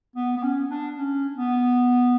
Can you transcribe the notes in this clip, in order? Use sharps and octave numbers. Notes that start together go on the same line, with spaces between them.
B3
B3
C#4
D4
C#4
B3